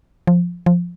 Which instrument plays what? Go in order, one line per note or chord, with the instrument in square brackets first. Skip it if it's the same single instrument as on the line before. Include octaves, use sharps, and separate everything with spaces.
[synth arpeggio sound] F3
F3